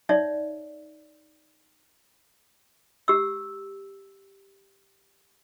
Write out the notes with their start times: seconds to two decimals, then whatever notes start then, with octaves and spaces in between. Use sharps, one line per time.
0.09 D#4 C#5 D5 E5
3.08 G4 E6